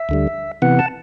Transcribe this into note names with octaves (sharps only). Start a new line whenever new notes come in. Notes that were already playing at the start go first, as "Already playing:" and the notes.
Already playing: E5
D2 D3 G3
C3 E3 B3 F#5
A5